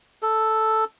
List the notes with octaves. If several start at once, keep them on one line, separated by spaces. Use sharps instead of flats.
A4